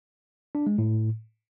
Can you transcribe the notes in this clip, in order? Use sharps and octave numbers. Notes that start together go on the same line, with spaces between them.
D4
G#3
A2